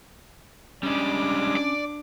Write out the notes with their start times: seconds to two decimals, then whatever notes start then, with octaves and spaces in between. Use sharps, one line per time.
0.83 G3 G#3 C#4 D4 D6
1.57 D5